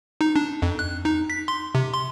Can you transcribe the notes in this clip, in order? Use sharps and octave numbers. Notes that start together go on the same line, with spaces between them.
D#4
D4
F2
F#6
D#4
B6
C6
C3
C6